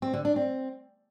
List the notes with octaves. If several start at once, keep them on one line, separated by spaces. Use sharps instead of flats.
C4
D3
D4
C4